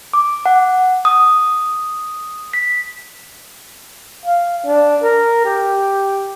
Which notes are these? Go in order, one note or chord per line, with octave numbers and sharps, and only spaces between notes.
D6
F#5
D#6
B6
F5
D4
A#4
G4